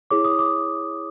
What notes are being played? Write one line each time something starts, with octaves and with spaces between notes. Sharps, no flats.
E4 G#4 C#5 D6
D#6
D6